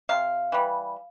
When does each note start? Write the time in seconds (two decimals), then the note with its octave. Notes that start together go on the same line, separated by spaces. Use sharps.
0.09 C3 F5
0.52 E3 G3